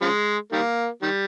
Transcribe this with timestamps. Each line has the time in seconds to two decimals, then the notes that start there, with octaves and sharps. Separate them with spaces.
0.02 C#3 F3 G#3
0.52 D#3 G3 A#3
1.02 D#3 G3